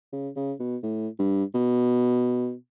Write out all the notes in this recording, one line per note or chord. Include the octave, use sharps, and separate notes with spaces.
C#3
C#3
B2
A2
G2
B2